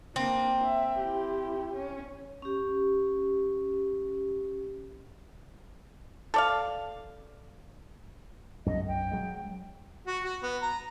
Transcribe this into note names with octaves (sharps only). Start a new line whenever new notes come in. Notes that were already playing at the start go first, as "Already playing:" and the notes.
A#3 C4 D4
E5
E4 G4
C#4
C#4 G4
A4 D5 F5
B1 F#2 D#5
G5
F#3 G#3
F#4
F#4
B3
A#5